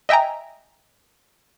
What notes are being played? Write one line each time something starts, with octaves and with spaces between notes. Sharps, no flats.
D#5 E5 G5 G#5 A#5